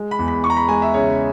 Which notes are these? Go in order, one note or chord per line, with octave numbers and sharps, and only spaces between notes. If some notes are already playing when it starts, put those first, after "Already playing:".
Already playing: G#3
B5
E2
B5
E2 C#6
A#5
B5
G#3 G#5
E5
C#3 C#5